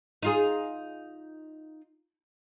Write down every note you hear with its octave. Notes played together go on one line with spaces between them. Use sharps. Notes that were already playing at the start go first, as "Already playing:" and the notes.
D#4 F4 G#4